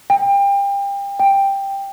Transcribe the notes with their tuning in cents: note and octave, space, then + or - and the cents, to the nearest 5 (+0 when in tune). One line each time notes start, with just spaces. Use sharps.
G5 +30
G5 +5